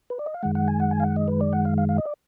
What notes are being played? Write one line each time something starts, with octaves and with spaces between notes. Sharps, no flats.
B4
D5
D#5
F5
F#2 D#3 G#3 F#5
F#5
G#5
F#5
G#5
F5
F#5
D#5
B4
D5
F#5
F5
F5
F5
D#5
D5